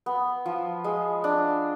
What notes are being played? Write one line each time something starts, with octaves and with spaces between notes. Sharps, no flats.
B3
F3
G#3
D4